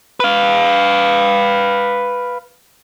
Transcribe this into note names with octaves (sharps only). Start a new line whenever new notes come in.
B4 F5